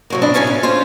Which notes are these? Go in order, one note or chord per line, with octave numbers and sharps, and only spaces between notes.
C3 F#3 A#3
D4 E4 D#5
C3 D#3 C#4 D#4 F5
A2
C#4 F4 C5